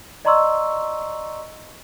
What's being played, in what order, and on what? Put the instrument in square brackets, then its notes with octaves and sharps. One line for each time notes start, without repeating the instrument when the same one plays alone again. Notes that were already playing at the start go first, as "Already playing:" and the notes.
[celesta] D5 D#5 A#5 C6 C#6 E6